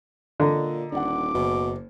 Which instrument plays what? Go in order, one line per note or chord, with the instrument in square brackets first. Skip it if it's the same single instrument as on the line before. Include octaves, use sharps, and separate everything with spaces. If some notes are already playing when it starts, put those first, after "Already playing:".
[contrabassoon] A#2 [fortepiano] D3 [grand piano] D#5 A#5
[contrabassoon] D#1 [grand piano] D4 F#5 [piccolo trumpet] D6
[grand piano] F#1 [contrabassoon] B2